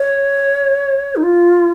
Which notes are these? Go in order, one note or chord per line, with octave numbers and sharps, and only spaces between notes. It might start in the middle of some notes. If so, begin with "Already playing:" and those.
Already playing: C#5
D#4
F4